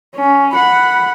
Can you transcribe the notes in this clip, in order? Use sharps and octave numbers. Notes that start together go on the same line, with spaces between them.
C#4
F#5 B5